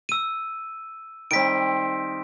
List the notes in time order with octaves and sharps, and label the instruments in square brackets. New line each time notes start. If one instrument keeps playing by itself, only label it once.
[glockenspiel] E6 D#7
[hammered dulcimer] D#3 G3 C4 [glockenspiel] B6 D7